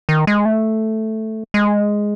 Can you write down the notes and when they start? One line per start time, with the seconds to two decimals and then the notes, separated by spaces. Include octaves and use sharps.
0.09 D#3
0.27 G#3
0.45 A3
1.54 G#3